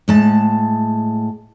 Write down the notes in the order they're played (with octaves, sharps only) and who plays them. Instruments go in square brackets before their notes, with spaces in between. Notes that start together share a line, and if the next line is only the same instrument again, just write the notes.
[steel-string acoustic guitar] A2 G#3 A5